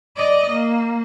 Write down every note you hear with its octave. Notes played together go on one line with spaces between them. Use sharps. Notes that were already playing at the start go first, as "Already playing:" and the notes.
D5 D#5
A#3